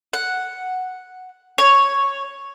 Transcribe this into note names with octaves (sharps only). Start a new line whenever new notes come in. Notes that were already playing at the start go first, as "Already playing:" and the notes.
F#5
C#5